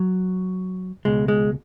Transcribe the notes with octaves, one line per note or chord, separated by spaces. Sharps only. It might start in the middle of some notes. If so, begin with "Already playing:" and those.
Already playing: F#3
C#2 B2 G#3
G#3